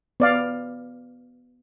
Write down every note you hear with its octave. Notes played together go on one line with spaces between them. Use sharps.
B3 D5 F5